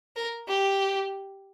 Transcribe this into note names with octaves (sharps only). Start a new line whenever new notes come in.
A#4
G4